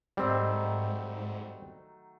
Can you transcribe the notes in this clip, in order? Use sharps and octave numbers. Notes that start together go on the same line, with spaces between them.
G#2 D#3 F#3 G3 A3 C4